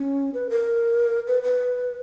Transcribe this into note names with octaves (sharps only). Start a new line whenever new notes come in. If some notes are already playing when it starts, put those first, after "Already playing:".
Already playing: C#4
B4
A#4
B4
B4